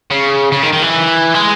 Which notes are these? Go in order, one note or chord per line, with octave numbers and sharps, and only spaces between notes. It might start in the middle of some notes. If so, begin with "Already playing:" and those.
C#3
C#3
D#3
D#3
E3
G#3